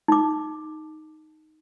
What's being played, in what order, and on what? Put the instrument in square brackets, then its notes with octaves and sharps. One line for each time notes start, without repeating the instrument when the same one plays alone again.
[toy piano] D#4 D6